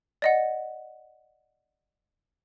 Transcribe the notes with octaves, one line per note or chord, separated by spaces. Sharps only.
D5 D#5 F#5